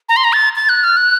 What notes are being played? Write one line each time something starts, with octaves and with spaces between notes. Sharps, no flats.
A#5
C6
A#5
A6
A6
F#6
F6
F#6